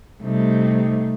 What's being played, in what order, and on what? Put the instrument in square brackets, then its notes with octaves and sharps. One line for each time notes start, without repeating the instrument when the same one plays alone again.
[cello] C3 G3 [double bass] A3 D#4